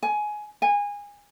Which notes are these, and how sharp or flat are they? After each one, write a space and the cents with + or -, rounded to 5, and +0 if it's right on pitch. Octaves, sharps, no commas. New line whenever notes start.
G#5 +15
G#5 -25